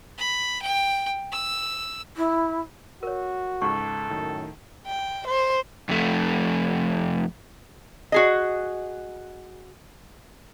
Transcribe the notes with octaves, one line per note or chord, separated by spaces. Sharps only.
B5
G5
E6
E4
F#4 A#4 C#5
C#2 G#2 A4 C#6
F#2 A2 D#3
G5
C5
F2 A3
F#4 G#4 D#5